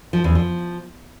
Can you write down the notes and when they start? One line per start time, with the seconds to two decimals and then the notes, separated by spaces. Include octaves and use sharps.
0.13 F3
0.24 E2
0.35 F3